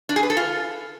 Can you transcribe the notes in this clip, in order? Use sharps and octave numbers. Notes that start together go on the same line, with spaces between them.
D4
G#4
B4
A4
F4